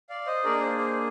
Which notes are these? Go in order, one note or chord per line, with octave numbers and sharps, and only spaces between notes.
D5 F5
C5 D#5
A#3 D4 G#4 A#4 D5
C5
C5